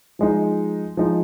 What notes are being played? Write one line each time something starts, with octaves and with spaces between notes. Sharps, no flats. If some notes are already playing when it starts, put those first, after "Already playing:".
F3 G#3 D#4
F3 G#3 D#4